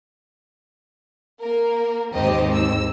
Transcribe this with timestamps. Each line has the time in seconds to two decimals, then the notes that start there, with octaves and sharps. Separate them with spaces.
1.40 A#3 A#4
2.12 D#2 G#2 C4 G4 D#5
2.54 E6